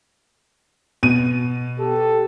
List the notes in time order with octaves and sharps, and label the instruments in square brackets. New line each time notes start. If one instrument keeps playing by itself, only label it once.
[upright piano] B2 D#7
[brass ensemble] G4 A4